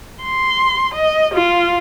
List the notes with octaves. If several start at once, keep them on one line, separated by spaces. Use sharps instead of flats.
C6
D#5
F4